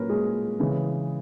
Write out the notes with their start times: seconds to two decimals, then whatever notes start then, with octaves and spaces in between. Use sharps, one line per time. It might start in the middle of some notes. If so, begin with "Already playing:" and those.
Already playing: A#2 F#3 A#3 C#4 A#4 B4
0.09 G#3 G#4
0.60 C#3 E3 G#3